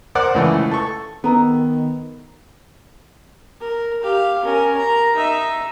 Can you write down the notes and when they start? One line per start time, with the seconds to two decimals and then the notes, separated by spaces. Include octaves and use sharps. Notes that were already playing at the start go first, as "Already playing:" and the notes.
0.15 A#4 C5 D5 F#5 D6 F#6
0.35 C#2 E3 A3
0.71 A4 C#6
1.24 D#3 B3 A4 A#5 E6
3.60 A#4
4.03 G4 F5
4.45 C#4 A#4
4.75 A#4 A#5
5.16 D#4 E5